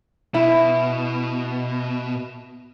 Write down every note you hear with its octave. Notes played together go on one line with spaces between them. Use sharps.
B2 E4